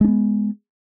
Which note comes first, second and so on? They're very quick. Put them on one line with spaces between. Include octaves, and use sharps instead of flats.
G#3 D4 B3